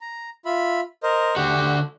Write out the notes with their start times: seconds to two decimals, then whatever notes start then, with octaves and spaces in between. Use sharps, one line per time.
0.01 A#5
0.45 F4 E5 B5
1.03 A#4 C5 D#5
1.36 D3 F#4 G4